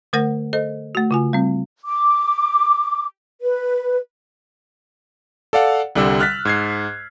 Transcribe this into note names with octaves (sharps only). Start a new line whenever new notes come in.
D3 A3 A#4 F#5 A#6
A4 C5 D#5
A3 F#4
C#3 F4 G#5
G3 C4
D6
B4
A4 D5 F5 F#5
C2 D3 G3 E6
F6 F#6 A6 B6
G#2 G#6 C7